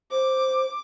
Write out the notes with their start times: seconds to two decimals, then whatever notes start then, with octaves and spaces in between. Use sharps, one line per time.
0.11 C5 D6